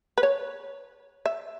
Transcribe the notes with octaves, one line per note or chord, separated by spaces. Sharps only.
B4
C#5
E5